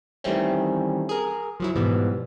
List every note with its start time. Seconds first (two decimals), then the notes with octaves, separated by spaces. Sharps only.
0.24 D#3 E3 G3 A3 C4 C#4
1.09 G#4 A#4
1.60 F3 F#3 E4
1.75 G#2 B2 E3 F3 G3 B3